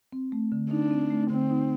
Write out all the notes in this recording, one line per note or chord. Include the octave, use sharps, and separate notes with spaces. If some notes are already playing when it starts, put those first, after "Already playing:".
C4
A3
D3
D4 D#4
C4
A3
D3 C4
D#4